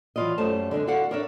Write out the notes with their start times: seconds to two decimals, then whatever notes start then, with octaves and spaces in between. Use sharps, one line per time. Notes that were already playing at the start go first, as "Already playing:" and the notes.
0.16 E3 F#3 G#3 F4 D5 D#5
0.38 F#2 G3 A3 C5 A5
0.71 D3 G#3 C4 D4
0.87 F#4 A4 D5 F5 F#5
1.11 D4 A#4 C#5 D5 E5